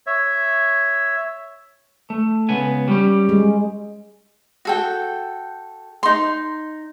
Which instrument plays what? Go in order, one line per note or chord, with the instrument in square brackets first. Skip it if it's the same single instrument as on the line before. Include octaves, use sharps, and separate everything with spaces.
[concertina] C#5 E5
[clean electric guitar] A3
C#2 B3 G#5
G3 C#4 G4
[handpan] G#3
[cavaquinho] F#4 A4 G5
D#4 C6